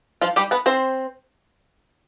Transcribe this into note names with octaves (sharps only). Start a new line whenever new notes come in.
F3 F4
G3 G4
B3 B4
C4 C5